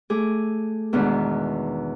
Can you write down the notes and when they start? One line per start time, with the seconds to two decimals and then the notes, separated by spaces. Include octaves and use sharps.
0.10 A3 G#4 D6
0.93 E2 G#2 B2 D#3 D4